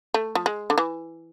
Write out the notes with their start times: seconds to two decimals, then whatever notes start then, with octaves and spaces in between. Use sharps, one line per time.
0.14 A3
0.35 F3
0.46 G#3
0.70 D3
0.78 E3